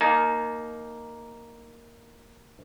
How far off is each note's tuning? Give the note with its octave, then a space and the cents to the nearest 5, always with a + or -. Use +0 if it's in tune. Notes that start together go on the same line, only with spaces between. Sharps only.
A#3 +0 D#4 +0 A5 -45